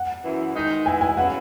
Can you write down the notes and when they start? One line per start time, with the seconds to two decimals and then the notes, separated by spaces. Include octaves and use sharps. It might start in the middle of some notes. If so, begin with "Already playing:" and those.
Already playing: F#5
0.24 F#2 E3 B3 E4
0.55 D#3 G#3 D#4
0.86 D#3 G#3 B3 E4 G#5
1.01 G#5
1.17 C#3 F#3 B3 E4 F#5